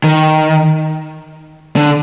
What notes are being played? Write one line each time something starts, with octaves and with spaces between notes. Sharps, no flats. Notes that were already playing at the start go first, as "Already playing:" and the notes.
D#3
D3